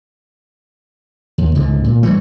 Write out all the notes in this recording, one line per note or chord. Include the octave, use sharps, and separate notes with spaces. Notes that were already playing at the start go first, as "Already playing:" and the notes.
D#2
C#2 G#2 D3
A#2
G2 E3 A3